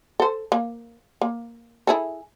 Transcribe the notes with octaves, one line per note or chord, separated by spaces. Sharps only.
A4 C5
A#3
A#3
E4 G#4 A4